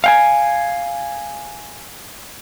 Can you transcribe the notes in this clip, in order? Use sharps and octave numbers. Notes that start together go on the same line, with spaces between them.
F5 G5 G#5